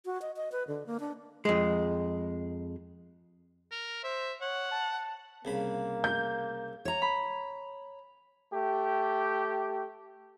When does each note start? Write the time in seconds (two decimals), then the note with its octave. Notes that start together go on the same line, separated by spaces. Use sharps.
0.05 F#4
0.22 D#5
0.36 D#5
0.52 B4
0.68 D3
0.86 A#3
1.00 D4
1.45 F2 G#3
3.71 A#4
4.04 C5 E5
4.41 C#5 F#5
4.71 A5
5.45 C2 C#3 A#3 B5
6.04 G6
6.85 C#5 A#5
7.02 B5
8.53 A3 G4